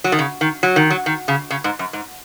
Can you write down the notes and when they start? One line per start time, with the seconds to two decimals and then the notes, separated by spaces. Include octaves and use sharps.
0.04 F#3
0.12 D#3
0.19 C#3
0.41 D#3
0.63 F#3
0.76 D#3
0.90 F#3
1.06 D#3
1.28 C#3
1.50 C#3
1.64 G#2
1.79 F#2
1.93 G#2